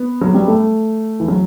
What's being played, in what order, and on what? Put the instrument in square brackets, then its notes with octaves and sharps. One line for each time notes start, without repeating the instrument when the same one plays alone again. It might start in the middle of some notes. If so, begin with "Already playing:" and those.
Already playing: [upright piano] B3
F#3
G3
A3
E3
F#3